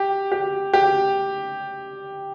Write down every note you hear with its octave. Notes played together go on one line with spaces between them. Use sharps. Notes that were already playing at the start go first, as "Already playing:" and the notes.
Already playing: G4
G4
G4